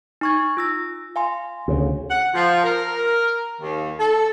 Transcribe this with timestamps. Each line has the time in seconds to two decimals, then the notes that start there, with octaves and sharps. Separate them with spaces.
0.21 D#4 C#6 G#6
0.57 F4 E6 A#6
1.16 F5 G#5 C6
1.68 D2 C#3
2.10 F#5
2.34 F3
2.63 A#4
3.61 D#2
3.99 A4